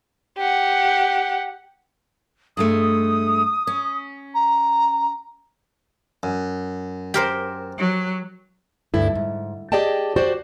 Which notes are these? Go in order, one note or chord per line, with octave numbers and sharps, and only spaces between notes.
G4 F#5
G2 G#3 A3 D#6
C#4
A#5
F#2
G4 A#4 C5
F#3
D2 G2 E4 A4
G#2
G4 G#4 D5 D#5 G5 A5
F#4 G4 C5 D5